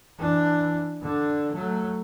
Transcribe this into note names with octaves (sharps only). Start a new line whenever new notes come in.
E3 D4
D3 D4
F#3 A3